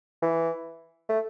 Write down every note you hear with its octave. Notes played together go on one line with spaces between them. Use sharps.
E3
A3